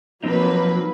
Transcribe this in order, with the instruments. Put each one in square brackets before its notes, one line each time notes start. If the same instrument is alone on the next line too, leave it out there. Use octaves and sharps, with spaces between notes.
[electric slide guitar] F3 C4 D#4 [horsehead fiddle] F#3 [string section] A#3 B4